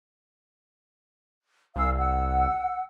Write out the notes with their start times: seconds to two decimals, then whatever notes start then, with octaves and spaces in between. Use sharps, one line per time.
1.76 C2 F5 G#5 E6
1.97 F#5 E6